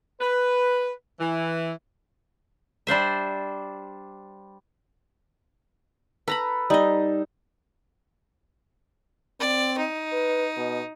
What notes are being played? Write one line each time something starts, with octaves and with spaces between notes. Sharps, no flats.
B4
E3
G3 D4 C5 E5
A4 B4 A#5 B5
G3 D#4 D#5
C4 D5
D#4
B4
B2